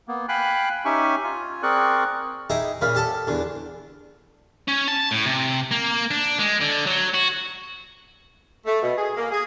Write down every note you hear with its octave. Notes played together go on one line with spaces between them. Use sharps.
A#3 B3
F5 G5 G#5 B5 F#6
C#4 D#4 G4 E5 G#5 C#6
F4 G#5
C4 G#4 A#4 D5 C#6 F#6
D#4 E4 G4 G#4
A#2 C#3 F5 B5
G4 A4 A5
E2 D3
C#4
A5
A2
C3
A#3
D4
G#3
D3
F#3
F#4
A3
B2
G#4
A#3
G#4